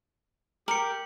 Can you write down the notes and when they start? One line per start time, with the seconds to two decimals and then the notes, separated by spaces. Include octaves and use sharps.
0.68 G4 A#4 C#7 F#7